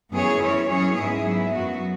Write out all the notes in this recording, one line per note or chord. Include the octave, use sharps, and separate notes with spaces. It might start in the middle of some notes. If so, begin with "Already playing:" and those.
F#2 E3 B3 G#4 C#5
E3 C#4 E4 C#5
F#2 E3 C#4 G#4 C#5
G#2 G#3 B3 E4 G#4
F#3 B3 E4
F#2 F#3 B3 F#4